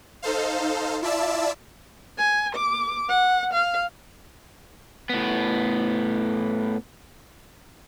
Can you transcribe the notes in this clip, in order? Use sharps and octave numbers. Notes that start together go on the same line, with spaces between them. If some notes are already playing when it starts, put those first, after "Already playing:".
D#4 A4 C5 F5
E4 F4 D5 E5 A5 E6
G#5
D6
F#5
F5
A2 B3